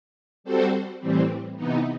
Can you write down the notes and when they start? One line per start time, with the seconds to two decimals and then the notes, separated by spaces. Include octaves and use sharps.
0.44 G3 C4 F#4 A4 C5
1.00 A2 E3 G3 C4
1.56 C3 E3 B3 D#4